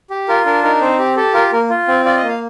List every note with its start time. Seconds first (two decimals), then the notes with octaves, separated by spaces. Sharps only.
0.10 G4
0.29 F4 A#4
0.45 D4 A#4
0.64 D#4 A#4
0.81 C4 C5
0.99 G4
1.16 G4 A4
1.34 F4 A#4
1.52 A#3 A#4
1.70 F4
1.88 C4
2.05 F4 D5
2.17 D#5
2.23 A#3
2.29 F5